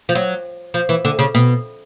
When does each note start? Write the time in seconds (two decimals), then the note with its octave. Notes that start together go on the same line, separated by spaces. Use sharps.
0.09 F3
0.15 F#3
0.74 F3
0.89 E3
1.05 D3
1.19 C#3
1.35 B2